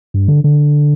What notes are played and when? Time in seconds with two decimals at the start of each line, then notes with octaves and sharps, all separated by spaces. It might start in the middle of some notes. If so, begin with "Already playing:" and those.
0.14 G2
0.28 D3
0.44 D3